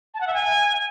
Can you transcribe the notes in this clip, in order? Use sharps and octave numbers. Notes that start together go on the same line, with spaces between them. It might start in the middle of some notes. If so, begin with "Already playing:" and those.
A5
F#5
E5
G#5